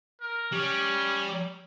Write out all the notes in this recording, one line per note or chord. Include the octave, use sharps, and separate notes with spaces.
A#4
G3 C#4